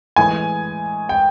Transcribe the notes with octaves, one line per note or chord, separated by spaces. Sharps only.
A2 E3 G#3 G#5
G5